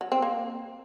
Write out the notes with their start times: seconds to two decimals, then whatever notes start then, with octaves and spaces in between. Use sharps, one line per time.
0.01 F#3
0.12 C4
0.22 A#3